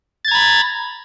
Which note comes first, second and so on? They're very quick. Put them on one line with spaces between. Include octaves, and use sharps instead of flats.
A6 G#6 A#5 B5